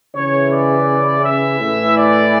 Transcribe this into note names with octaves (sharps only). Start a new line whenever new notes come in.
C#3 E3 C#5
D5
E5
A2 E3
D5